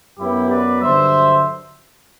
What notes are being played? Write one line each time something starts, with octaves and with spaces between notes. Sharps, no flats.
F#2 F#3 B3 E4 G4
B4 D5
G2 D3 F#3 C5 E5